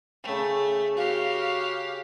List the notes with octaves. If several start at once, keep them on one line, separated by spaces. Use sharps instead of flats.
C#3 A3 G5
F#4 G4 F5